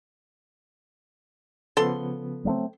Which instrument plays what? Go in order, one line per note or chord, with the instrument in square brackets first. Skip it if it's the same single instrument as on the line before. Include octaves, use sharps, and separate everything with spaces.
[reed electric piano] C#3 F3 B3 [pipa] A4 C6
[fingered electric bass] F#3 A3 C4